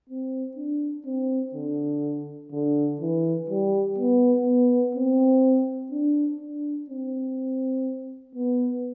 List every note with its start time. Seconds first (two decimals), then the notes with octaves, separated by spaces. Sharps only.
0.09 C4
0.57 D4
1.06 C4
1.55 D3
2.52 D3
3.01 E3
3.50 G3
3.98 B3
4.46 B3
4.95 C4
5.92 D4
6.41 D4
6.90 C4
8.35 B3